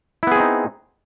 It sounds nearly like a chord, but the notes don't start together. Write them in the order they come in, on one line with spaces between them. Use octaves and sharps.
E4 B3 G#4 C4 D#4